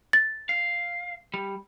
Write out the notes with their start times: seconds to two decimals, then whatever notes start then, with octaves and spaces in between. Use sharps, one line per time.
0.13 A6
0.49 F5
1.34 G3